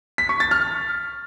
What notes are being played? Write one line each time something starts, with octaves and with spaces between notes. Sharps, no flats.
B6
C#6
A6
F6